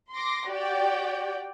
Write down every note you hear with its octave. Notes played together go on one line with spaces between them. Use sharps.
C6 D6 A#6
F#4 G4 D5 G5